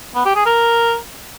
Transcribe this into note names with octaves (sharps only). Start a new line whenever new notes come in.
B3
G4
G#4
A#4